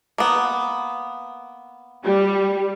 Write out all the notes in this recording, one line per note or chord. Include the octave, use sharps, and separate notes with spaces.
A#3 B3
G3